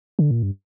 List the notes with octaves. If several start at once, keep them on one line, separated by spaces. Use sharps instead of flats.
D3
A#2
G2